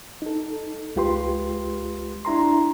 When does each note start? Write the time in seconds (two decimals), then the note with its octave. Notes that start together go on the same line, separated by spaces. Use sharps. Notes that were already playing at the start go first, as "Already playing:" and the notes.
0.22 D#4 A4
0.96 C#2 G#3 F4 G4 B4 C6
2.25 D4 E4 A#5 C6